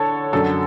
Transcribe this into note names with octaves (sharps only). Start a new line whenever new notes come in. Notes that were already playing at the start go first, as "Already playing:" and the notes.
Already playing: D3 A4 C#5
F#2 D3 F#3 A4